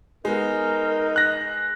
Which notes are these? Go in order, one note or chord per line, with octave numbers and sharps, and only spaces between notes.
G#3 B3 D#4 A#4
F#6 A#6